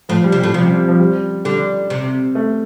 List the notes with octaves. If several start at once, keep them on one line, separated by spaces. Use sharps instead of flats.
A2 F3
G3
C3
A2 G3
C3 F3
G3
F3
G3
D3 G3
C3
A3